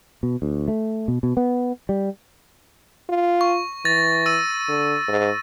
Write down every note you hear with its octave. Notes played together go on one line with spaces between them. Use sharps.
B2
D2
A3
B2
B2
B3
G3
F4
C#6
E3 A6 A#6
E6 D#7
D3
G#2